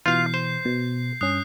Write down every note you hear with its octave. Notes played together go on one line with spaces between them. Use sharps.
B2 E3 F4 F5 G6 C7
C5
B2
G2 C#4 D#6 F#6 C7